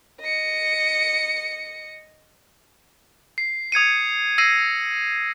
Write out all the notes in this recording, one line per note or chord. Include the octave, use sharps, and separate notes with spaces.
D#5 C#7
C7
D#6 G#6 C#7 D#7
E6 A#6 C7 D#7